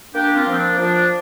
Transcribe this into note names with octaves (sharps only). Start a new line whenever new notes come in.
A#3 D4 G4
C4 F4
F3 C4
D4
F3 D4